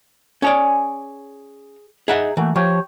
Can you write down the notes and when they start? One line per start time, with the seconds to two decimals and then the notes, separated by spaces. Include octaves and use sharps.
0.42 C#4 G#4 C#5 D5
2.08 D#4 G#4 E5 F#5
2.37 E3 A3 A#3 F#4
2.56 F3 G4 C#5 G5